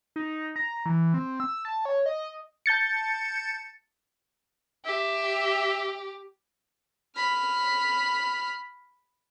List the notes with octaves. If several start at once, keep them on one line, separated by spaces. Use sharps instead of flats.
D#4
A#5
E3
C4
E6
A5
C#5
D#5
A5 G6 A6 C#7
G4 E5
B5 F6